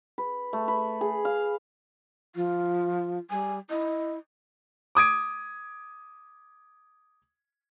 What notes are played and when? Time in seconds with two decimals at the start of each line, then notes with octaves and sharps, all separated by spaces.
0.18 B4
0.53 A3
0.68 B4
1.01 G#4
1.25 F5
2.36 F3 F4
3.30 G3 G#5
3.70 E4 D#5
4.95 D6 D#6 G#6 D7